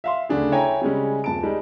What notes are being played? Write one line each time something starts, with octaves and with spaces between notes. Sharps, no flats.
E5 F5 C6
D2 C#3 D4 G#4
E4 C#5 G5 G#5 A#5
C#3 G3 G#3 C#4
D#1 A5 D7
G3 G#3 D#4